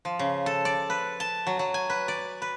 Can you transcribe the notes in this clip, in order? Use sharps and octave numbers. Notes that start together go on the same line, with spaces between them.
F3
C#3
A4
D5
B4
A5
F#3
F#3
G#5
B4
D5
B4